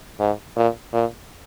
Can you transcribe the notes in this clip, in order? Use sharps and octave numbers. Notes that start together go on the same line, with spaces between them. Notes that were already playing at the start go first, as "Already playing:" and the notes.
G#2
A#2
A#2